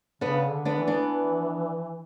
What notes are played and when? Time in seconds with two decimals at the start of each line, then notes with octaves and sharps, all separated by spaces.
0.21 C#3 B3 D4
0.51 D3
0.65 B3 D4
0.80 E3
0.88 B3 D4